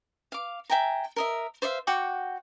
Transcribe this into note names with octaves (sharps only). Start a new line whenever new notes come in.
F5 D6
E5 G5 G#5 A#5
A#4 D#5 E5
C5 D5 E5 F5
F#4 F#5 G5 D6